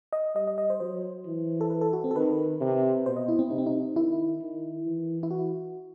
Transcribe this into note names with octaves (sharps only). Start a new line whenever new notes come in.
D#5
G3 D#5
D#5
D#5
C5
F#3 C5
E3
A4
B4
A4
F#4
C4
A4
D#3 B4
C3
B2 C5
D#5
E4
C4
C3 D#4
C4
D#4
D#3 E4
D#3
E3
E4
F#4